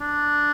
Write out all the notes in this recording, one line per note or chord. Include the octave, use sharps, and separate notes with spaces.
D4